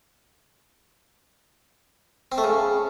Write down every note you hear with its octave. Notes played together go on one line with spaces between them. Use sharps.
C4
A3
C#3